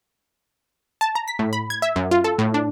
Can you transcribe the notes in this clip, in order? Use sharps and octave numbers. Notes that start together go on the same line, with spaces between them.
A5
A#5
B6
A2
B5
G#6
E5
F#2
F4
A4
A2
D4